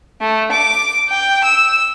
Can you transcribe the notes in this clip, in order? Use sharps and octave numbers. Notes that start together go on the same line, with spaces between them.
A3
D6
G5
E6